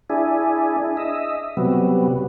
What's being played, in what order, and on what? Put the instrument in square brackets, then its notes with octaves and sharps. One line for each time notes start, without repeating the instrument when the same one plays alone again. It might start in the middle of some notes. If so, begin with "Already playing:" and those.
[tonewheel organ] D4 E4 G#4
D#5 E5
C3 F#3 G3 B3